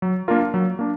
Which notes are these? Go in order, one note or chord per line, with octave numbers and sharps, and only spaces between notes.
F#3
A#3 D4 F4 A#4
F#3
A#3 D4